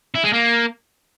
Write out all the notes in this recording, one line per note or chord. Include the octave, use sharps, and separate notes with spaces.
E4
G#3
A#3